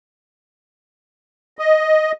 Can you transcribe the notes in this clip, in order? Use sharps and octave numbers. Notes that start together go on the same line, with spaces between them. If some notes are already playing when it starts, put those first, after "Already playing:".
D#5